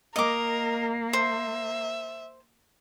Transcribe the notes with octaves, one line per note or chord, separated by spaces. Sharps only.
A#3 A#4 D#5 D6
C5 E5